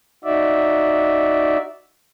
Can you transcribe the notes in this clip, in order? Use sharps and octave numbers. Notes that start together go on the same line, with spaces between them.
D#4 F#4 D5 E5